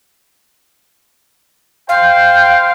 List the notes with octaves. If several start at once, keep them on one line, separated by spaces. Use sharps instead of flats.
C5 F5 G5